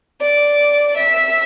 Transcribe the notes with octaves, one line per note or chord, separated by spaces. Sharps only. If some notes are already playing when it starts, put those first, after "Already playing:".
D5
E5